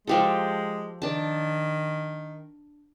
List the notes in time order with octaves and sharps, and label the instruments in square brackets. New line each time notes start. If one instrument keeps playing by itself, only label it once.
[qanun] F3 G4 A4 [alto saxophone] G#3
[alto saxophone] D#3 [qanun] D4 A5